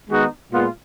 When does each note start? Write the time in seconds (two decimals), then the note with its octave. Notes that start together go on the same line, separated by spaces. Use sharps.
0.10 D#3 G#3 B3 D#4 F#4
0.51 A#2 G#3 B3 F4